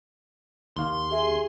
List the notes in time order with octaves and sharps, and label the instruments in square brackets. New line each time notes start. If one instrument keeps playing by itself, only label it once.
[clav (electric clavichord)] D#2 F5 [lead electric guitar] C6
[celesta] G4 E5 [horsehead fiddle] G#4